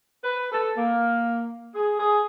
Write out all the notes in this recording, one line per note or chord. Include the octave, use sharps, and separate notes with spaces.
B4
A4
A#3
G#4
G#4